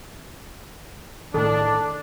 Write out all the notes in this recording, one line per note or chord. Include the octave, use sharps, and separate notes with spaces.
A2 D#3 D4 A4